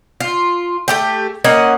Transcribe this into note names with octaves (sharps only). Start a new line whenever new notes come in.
F4
A3 G4 G5
A#3 C#4 D#5 F#5